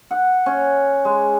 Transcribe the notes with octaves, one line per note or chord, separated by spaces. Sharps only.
F#5
C#4
G#3